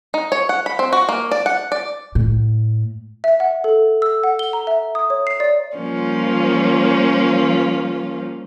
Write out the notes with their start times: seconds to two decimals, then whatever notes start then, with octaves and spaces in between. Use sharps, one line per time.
0.14 D#4
0.32 C#5
0.49 F#5
0.66 B5
0.79 C4
0.93 F#4
1.09 A#3
1.31 D5
1.46 F#5
1.72 D5
2.15 A2
3.24 E5
3.40 F#5
3.64 A4
4.02 E6
4.24 F#5
4.39 G7
4.53 A#5
4.67 E5
4.95 D#6
5.10 C#5
5.27 C7
5.40 D5
5.76 F3 G3 A#3 C#4 F4